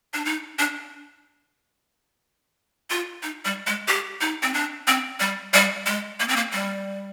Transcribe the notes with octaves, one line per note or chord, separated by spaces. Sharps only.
D4
D#4
D4
F4
D#4
G3
G#3
G4
D#4
C4
D4
C4
G3
G3
G#3
A#3
C4
A#3
G3